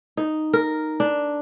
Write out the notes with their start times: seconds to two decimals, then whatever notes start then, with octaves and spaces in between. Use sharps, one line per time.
0.17 D#4
0.53 A#4
1.00 D4